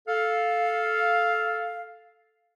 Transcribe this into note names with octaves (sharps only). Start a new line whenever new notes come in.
A4 F5